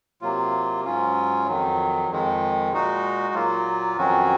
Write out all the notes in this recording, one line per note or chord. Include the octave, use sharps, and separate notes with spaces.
C3 F#3 A#3 F4
G#2 F#3 C#4 F4
F2 D#3 F#3
F2 D#3 G#3
A#2 G#3 D#4 F#4
A#2 F#3 A#3 F4
F2 D#3 F#3 C#4 F#4